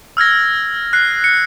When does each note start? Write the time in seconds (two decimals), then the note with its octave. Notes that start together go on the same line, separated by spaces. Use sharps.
0.17 E6 F6 G#6 A#6
0.93 F#6 C7
1.24 C#7